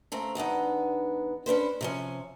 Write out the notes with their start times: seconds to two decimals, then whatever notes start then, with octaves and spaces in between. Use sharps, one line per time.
0.12 C#3 A3 C4 A#5
0.35 E2 B3 D4 D#4
1.46 C#4 D4 B4 C5
1.81 C3 F3 C#4